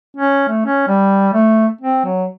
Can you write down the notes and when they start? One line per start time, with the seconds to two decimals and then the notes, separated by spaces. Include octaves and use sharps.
0.17 C#4
0.48 A3
0.66 C#4
0.88 G3
1.34 A3
1.81 C4
2.05 F#3